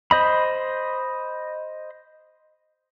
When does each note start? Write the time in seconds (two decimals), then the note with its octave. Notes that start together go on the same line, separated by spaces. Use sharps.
0.11 C5 D#5 B5